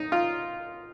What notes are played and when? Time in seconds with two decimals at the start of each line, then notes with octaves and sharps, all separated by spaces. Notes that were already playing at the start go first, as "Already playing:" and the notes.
Already playing: D#4
0.12 F4